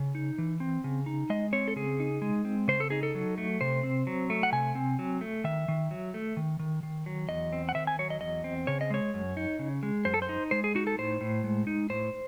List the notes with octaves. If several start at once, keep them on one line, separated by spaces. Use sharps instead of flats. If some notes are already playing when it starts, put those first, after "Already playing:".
Already playing: C#3
D#4
E3
C4
C#3
D#4
G#3 D#5
C4 C#5
A4
C#3 G#4
D#4
G#3
C4
C#3 C5
A4
D#4 G#4
A4
F#3
A3
C3 C5
C4
F#3
A3
F#5
C3 G#5
C4
F#3
A3
D#3 E5
D#3
F#3
A3
D#3
D#3
D#3
F#3
E2 D#5
C4
F#5
D#3 E5
G#5
F#3 C#5
D#5
E2 D#5
C4
C#3 C#5
D#5
G#3 C#5
F#2
D#4
C#3
G#3
F#2 C5
A4
C5
D#4
G#3 C5
G#4
D#4 F#4
A4
A2 C5
A2
G#3
D#4
A2 C5